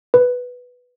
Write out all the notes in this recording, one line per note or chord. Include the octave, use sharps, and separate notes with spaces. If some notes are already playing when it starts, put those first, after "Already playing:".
B4